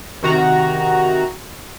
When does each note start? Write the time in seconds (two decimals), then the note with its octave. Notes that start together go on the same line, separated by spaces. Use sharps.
0.23 C3 D#3 F#4 A#5